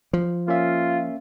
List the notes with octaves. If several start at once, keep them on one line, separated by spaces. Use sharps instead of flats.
F3
A#3 C#4 F4 E5